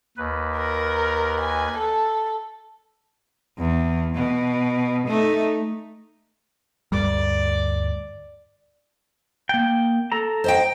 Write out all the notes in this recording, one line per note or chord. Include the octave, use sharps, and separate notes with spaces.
D#2 B4
A#4
G#5
A4
E2
B2
A3 D#4
D2 G2 G3 D5
A#3 G5
A4 A#5
C5 D#5 G5